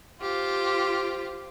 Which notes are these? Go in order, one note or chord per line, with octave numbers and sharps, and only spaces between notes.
F4 G4 C5